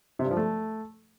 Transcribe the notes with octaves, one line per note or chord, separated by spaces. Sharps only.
C3
G2
F3
A3